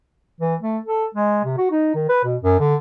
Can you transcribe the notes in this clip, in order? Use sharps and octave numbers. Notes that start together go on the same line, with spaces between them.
E3
A3
A4
G#3
C3
F#4
D#4
D#3
B4
B2
F#2
D3